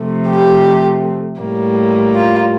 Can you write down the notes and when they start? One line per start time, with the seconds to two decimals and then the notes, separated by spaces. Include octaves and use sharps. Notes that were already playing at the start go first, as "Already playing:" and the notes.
Already playing: C3 F3 A3
0.28 G4
1.41 A2 G3 A#3
2.15 F4